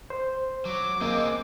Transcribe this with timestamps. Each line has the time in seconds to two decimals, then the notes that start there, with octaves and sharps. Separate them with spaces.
0.10 C5
0.65 F#3 D6
1.01 A#3 C4 G#4 D#5